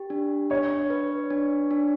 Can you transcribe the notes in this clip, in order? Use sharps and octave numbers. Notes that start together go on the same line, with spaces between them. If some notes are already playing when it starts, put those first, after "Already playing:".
Already playing: G4
D4
D4 C#5
B4
D4
D4